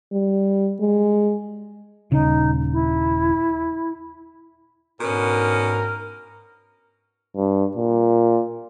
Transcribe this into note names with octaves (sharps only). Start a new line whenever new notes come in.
G3
G#3
D#1 C#3 D#4
E4
G#2 B2 D3 C#4 A#4
G2
A#2